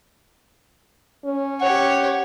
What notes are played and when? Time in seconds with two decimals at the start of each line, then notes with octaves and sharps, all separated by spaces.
1.25 C#4
1.61 G4 C#5 F#5